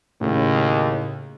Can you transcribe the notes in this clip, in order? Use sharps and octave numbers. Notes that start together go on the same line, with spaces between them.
D#2 A2 C#3